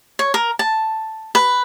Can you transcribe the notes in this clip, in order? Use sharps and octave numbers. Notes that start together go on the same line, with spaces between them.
C#5
A#4
A5
B4